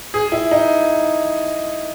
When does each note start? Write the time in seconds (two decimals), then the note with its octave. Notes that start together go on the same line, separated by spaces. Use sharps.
0.14 G#4
0.32 E4
0.51 D#4